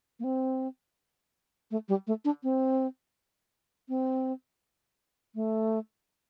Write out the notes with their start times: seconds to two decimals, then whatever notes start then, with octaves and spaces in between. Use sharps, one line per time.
0.19 A#3
0.24 C4
1.71 A3
1.89 G3
2.07 A3
2.25 D4
2.43 C4
3.89 C4
5.35 A3